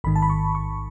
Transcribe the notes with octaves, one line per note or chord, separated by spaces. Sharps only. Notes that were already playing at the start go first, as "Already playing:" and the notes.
A1 G#2 D#3 B5
A5
B5
C#6
C#6